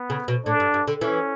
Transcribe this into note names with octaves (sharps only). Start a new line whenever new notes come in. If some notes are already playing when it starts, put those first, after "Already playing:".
Already playing: B3
C#3
B2
A2 D4
G2
G2
D3
E3 C#4